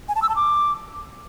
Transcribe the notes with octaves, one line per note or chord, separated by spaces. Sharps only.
G#5
A5
E6
A5
D6